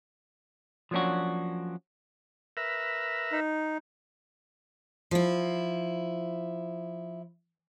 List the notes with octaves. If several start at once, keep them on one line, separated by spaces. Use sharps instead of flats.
F3 F#3 A#3 C#4 D4 F#4
A#4 B4 E5
D#4
F3 E4